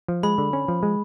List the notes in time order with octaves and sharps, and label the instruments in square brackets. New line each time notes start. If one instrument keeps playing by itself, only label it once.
[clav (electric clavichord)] F3
[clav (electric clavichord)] G#3 [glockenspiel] B5
[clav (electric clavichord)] D3
C#4
F3
G#3